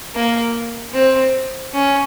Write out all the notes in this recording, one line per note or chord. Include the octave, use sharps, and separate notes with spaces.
A#3
C4
C#4